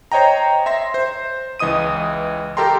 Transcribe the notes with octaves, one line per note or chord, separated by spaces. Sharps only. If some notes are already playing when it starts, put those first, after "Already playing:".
C5 C#5 D#5 G5 A#5
E5 C6 A#6
C5
C#2 E3 D#5 D#6 D#7
G4 A4 A#4 G5 A#5 C6